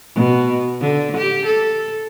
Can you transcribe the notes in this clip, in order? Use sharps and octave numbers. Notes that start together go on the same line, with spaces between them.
B2
D3
G4
A4